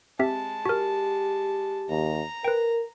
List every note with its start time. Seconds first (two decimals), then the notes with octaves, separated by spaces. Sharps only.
0.19 G#3 C4 G4 E5 A5
0.66 F#4 G4 A#4
1.89 D#2 A#5
2.44 A#4 B4 G5